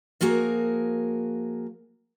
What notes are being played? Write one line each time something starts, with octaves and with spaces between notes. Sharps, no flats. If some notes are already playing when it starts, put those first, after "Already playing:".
F3 A#3 F#4 G#4 A#4